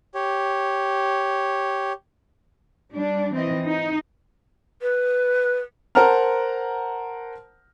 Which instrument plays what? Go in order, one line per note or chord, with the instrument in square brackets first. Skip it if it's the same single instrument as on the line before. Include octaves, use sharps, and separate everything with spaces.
[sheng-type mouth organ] G4 C#5
[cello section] G3 D4
E3 C4 D#5
D#4
[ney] B4
[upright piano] A#4 C5 F#5 A5 A#5 F6